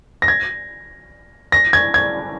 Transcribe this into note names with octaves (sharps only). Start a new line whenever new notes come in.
A#6
G#6
A#6
G#6
G#6